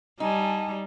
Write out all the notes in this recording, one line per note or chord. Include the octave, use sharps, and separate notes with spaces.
G3 D#4 G#5 A5